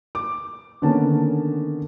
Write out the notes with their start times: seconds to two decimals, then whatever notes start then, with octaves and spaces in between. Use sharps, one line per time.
0.15 D6
0.82 D3 D#3 A#3 B3 C#4 A5